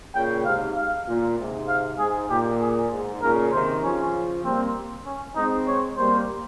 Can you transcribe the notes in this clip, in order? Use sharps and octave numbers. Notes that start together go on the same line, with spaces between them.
A#2 C#3 G5
G#2 C3 F5
F5
A#2
G#2 C3
F5
G#2 G#4
A#2 G4
G#4
G#2
A#2 C#3 A#4
C3 D#3 C5
C#3 F3 C#4
G3 A#3 C4
C#4
G#3 C4 D#4
C#5
G3 A#3 C5